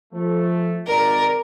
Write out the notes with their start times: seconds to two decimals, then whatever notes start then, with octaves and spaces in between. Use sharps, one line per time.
0.13 F3 A3
0.87 G#1 A#4 D5